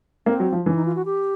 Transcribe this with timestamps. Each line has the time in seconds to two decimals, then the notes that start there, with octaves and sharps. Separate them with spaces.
0.26 A#3 C4
0.40 F#3
0.52 F3
0.66 E3 C#4
0.76 D#4
0.85 F4
0.95 F#4
1.06 G4